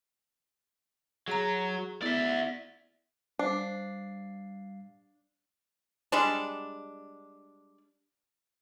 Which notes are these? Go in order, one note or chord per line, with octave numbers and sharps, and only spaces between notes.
F#3 G#4 A#5
B3 E4 D5 E5
G3 D4 C5 F5 C7
G3 G#3 D4